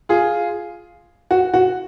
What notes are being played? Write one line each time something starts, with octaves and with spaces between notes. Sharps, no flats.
F4 G#4
F#4
F#4